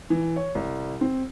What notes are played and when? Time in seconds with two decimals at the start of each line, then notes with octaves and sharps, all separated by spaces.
0.10 E3
0.36 C#5
0.55 C2
1.01 C4